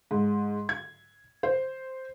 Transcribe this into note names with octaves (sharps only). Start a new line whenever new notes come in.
G#2
G#6
C5